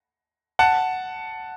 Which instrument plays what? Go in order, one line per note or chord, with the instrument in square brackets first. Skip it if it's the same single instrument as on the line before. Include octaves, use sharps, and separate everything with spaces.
[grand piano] F#5 A5